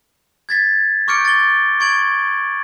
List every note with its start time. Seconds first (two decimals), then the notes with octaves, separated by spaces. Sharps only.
0.49 G#6 A6 B6
1.08 C#6 D6 F6 G6 C#7 D7
1.25 A6 G7
1.80 C#6 G#6 D7 F#7